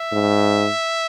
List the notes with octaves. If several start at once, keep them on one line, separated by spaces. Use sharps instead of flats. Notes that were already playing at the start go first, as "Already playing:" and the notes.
Already playing: E5
G#2